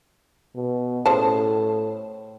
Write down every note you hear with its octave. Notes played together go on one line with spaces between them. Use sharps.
B2
A2 C#3 C5 A5